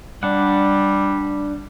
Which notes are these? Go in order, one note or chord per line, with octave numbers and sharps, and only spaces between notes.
G3 D4 F#5